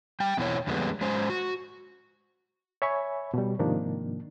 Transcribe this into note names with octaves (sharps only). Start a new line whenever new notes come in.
G3 G5
E2 B2 E3 C4 E4 C#5
F2 D3 G3 G#3 B3
F#3 G#3 C#4 C5
F#4
C#5 E5 G#5 B5 C#6
B2 G3
G#2 C3 D#3 F3 A#3 D4